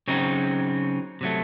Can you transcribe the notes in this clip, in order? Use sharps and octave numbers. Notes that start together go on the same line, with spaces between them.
C#3 F#3 C4 D#4
C3 F#3 A3